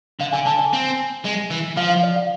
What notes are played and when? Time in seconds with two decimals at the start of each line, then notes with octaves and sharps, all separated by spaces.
0.20 D3 F5
0.32 D3 G#5
0.46 D3 A5
0.59 G#5
0.73 C4
1.25 G#3
1.50 E3
1.77 F3 F5
1.90 F5
2.03 D5
2.16 F5